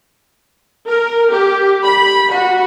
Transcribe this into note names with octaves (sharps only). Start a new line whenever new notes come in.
A#4
G4
B5
F#4